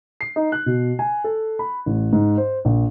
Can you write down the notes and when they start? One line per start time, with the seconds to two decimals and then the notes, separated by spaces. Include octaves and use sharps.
0.21 C7
0.36 D#4
0.52 F#6
0.66 B2
0.99 G#5
1.24 A4
1.59 B5
1.86 A1
2.13 G#2
2.38 C5
2.65 A#1